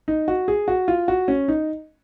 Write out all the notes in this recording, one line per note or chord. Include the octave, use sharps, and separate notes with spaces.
D#4
F#4
G#4
F#4
F4
F#4
C#4
D#4